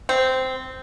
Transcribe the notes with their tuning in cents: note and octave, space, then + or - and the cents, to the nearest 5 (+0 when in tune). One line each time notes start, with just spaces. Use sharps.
C4 -10